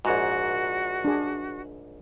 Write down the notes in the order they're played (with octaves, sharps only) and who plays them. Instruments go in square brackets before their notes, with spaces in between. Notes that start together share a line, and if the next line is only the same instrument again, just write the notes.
[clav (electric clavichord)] A#1 G#2 [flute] F#4
[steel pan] D4 G#4